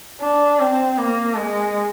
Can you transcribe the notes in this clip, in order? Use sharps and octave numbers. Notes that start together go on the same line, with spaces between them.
D4
C4
A#3
G#3